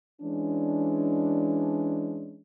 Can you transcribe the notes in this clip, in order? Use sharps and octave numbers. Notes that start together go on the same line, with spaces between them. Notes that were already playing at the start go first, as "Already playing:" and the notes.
E3 G#3 C#4 D4